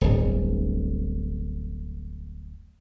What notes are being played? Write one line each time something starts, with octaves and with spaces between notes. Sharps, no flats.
D1 G1